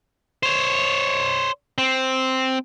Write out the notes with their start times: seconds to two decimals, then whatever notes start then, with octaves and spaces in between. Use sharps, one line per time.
0.43 C5 C#5
1.78 C4